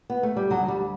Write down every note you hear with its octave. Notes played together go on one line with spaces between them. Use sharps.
B3
A3
G3
D2 D3 F#3
G3